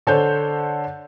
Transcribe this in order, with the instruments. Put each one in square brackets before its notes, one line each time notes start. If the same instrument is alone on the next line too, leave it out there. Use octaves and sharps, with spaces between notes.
[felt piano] D3 A4 C5 C#5 G6